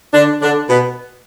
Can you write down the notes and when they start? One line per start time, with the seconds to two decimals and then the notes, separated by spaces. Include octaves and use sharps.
0.14 D3 D4
0.42 D3 D4
0.69 B2 B3